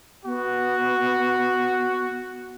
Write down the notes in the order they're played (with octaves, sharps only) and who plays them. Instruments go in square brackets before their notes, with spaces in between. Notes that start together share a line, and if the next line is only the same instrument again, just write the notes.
[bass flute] B3 [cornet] F#4